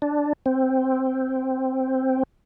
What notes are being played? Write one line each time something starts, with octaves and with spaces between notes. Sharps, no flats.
D4
C4